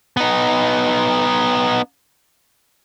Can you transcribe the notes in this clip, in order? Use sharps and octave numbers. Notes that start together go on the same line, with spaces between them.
B3 D#4